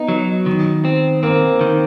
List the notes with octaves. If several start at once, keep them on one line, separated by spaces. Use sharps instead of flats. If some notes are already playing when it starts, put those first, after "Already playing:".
Already playing: B3 D#4
F#3
D#3
C4
A#3 C4
D#3